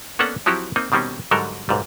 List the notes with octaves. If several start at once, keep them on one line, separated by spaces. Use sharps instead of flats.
A#3 B3 C#4 D4 A4 F#5
F3 F#3 C4 E4 F#4 G4
A#3 C4 D#4
B2 D#3 G3 C4 C#4
G#2 D3 F#3 G3 A4 A#4
B1 G#2 G3